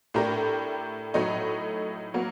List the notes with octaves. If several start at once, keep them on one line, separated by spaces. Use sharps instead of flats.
A2 A3 D4 G4 A#4
A2 F#3 A3 D#4
F#3 A#3 F#4